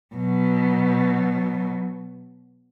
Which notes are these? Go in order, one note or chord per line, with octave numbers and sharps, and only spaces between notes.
B2 F#3